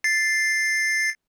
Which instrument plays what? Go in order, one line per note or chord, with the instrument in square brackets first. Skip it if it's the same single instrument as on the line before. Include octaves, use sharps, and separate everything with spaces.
[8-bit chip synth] A6 C7